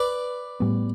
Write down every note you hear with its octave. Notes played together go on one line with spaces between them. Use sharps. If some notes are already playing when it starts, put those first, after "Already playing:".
Already playing: B4 D5
A2 G3 B3